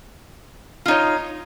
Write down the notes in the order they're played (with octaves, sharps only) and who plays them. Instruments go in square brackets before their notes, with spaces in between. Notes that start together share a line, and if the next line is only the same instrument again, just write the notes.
[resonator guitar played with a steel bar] F4
D#4
C#5